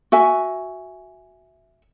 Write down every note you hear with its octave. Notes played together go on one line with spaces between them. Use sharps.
F#4 E5 G#5